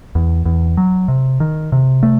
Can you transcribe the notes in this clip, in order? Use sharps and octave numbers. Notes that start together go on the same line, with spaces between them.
E2
E2
F#3
C3
D#3
C3
A3